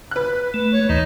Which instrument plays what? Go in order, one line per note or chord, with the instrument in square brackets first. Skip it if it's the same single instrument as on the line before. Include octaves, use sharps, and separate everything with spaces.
[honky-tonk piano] B4 F#6
[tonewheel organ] A3
[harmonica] C#5
[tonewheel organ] D#2 E3 [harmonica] D#4